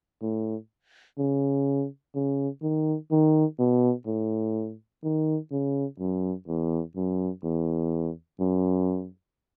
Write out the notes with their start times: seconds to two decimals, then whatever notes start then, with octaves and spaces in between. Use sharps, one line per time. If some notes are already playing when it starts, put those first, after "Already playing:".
0.22 A2
1.18 C#3
2.15 C#3
2.62 D#3
3.11 D#3
3.59 B2
4.06 A2
5.04 D#3
5.51 C#3
6.00 F#2
6.48 E2
6.96 F#2
7.44 E2
8.40 F#2